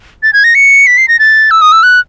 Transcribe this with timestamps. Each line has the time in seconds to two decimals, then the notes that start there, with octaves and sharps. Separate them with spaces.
0.23 A6
0.33 G#6
0.44 A#6
0.55 C#7
0.87 B6
0.97 C7
1.08 A#6
1.19 A6
1.51 E6
1.61 D#6
1.72 E6
1.83 F#6